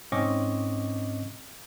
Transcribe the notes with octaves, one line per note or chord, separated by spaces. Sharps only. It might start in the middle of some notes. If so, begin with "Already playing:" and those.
G#2 C4 C#4 D#5 C#6 D6